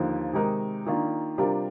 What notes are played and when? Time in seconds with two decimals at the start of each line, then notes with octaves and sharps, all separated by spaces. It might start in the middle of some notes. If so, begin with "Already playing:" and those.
Already playing: D#2 D3 F3 A#3 D#4
0.33 C3 D#3 G#3 D#4 A#4
0.86 D#3 A#3 D4 F4
1.38 C3 G3 D4 F4 A#4